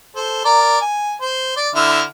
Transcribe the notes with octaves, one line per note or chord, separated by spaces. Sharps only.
A4 C5
A#4 D5
G#5
C5
D5
D3 E4 F6